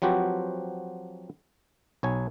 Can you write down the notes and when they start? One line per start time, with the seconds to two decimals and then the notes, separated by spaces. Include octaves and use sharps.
0.02 F3 F#3 C4 F#4 G4 B4
2.03 B1 C#5 G#5